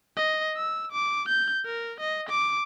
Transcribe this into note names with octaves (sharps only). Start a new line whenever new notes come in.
D#5
E6
D6
G6
A#4
D#5
D6